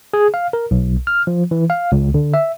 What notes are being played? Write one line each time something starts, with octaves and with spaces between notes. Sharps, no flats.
G#4
F5
A#4
B1
F6
F3
E3
F5
C#2
D3
E5